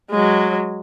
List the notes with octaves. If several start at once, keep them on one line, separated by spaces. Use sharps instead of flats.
F#3 G#3